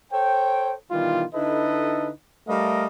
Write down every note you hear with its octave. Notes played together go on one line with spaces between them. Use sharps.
A4 C5 C#5 G5
B2 D#3 E3 G3 F4
D3 D#4 E4 A4 B4 D#5
G3 A3 A4 A#4 D#5 F5